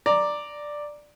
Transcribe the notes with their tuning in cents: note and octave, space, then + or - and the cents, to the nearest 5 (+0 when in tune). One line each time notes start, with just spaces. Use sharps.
D5 +5 A#5 +0